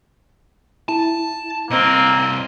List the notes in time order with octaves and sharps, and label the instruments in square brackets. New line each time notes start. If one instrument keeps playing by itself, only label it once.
[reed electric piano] E4 [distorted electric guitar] A5
[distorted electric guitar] C2 D#5 [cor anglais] A#3 [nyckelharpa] C4